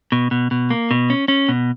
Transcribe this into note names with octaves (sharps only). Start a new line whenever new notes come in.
B2
B2
B2
A#3
B2
C#4
C#4
B2